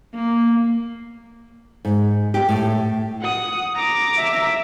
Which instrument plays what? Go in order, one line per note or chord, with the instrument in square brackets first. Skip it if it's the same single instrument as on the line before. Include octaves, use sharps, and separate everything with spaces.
[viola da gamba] A#3
[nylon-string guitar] G#2
G4
A2
[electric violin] F#5 D#6
A#5 D6
[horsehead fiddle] E5